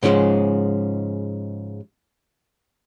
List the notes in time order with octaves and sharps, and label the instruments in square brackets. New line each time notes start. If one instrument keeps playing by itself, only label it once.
[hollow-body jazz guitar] G#2 C#3 F3 G3 G#3